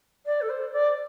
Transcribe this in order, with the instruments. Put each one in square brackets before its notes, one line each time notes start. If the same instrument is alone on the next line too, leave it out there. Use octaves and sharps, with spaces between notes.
[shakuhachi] D5
A4
C5
D5